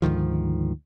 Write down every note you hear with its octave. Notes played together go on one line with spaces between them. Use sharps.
D2 G#2 D#3 F3